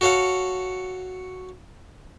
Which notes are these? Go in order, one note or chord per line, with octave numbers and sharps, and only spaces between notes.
F#4 A4 C#5 F5 F#5